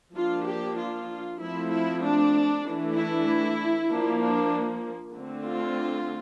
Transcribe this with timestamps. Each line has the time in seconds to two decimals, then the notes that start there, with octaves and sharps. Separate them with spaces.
0.15 F3 A#3 D4 F4
0.46 G4
0.77 F4
1.40 F3 A3 C4 E4
1.71 E4
2.03 D4
2.65 E3 A3 D4
2.95 E4
3.89 F3 A#3 D4
4.21 D4
5.14 D3 A3 C4
5.46 F4